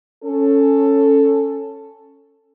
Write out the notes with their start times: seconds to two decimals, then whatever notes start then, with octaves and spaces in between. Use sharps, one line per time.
0.25 C#4 A4